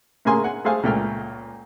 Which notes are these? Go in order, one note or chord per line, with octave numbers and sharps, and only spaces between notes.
A2 C#3 A#3 G#4 G#5 C6
F#5 G#5
A3 G#4 C5 F5 G#5
C#2 A#2 A3 G5 F6